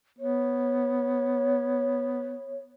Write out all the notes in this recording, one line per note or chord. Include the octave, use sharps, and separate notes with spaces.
B3 C#5